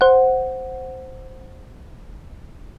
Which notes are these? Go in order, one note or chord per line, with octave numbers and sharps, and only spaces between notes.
C5 F#5